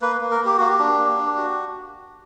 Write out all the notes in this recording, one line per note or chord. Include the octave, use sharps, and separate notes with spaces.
A#3 B4
A#3
A#4
A#3 G4
A#3 F#4
G4
D4
A#3
D4
F#4